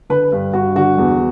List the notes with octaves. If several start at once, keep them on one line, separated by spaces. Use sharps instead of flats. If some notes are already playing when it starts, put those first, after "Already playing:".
D3 B4
G2
G2 F#4
D3 F#4
E2